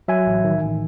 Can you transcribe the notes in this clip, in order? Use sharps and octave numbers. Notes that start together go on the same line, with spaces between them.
F#3 E5 G#5
A1
D#3
A1